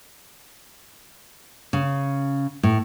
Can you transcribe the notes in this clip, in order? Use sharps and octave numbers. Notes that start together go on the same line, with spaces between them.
C#3
A2